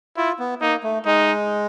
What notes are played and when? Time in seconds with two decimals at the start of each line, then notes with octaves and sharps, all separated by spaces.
0.17 E4 F4
0.39 B3
0.61 A#3 D#4
0.83 A3
1.05 G#3 D#4